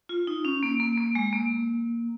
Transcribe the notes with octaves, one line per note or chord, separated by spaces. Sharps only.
F4
D#4
C#4
A#3
A#3
A#3
G#3
A#3